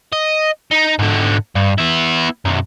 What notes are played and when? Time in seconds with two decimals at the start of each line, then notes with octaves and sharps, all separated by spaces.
0.13 D#5
0.71 D#4
0.99 G#2 D3
1.56 G2
1.78 B3 E4
2.45 B1 F#2